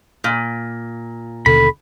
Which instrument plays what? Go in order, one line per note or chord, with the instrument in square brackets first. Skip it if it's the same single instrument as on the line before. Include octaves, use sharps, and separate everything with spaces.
[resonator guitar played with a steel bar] A#2
[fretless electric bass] D#2 B2 D3 [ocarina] A4 [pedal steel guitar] B5